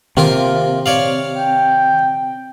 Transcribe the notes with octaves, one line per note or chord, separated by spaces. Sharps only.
C3 D#3 A#3 F4 A#4
C#5 D5 F5
G5